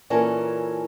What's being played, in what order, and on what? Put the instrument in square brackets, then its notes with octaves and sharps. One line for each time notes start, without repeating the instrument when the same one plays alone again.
[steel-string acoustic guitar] A#2 E3 C#4 A4 A#4